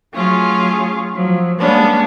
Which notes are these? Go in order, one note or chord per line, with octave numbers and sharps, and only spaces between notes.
F#3 A3 C#4 F4 G#4
F3 F#3
G3 G#3 A#3 B3 C#4 D4